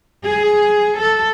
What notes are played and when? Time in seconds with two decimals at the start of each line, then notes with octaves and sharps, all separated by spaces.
0.25 G#4
1.00 A4